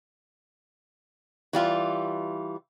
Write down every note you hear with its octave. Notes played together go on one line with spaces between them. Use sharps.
E3 G3 F4